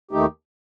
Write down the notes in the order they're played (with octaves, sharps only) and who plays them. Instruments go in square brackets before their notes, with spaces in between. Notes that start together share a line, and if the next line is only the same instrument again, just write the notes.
[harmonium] D#2 D#3 A3 D#4 G4